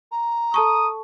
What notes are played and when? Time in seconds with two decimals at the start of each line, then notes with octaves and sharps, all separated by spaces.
0.11 A#5
0.54 A4 A5 C#6 D#6